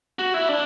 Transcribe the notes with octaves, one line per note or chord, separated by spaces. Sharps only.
F#4
E4
D4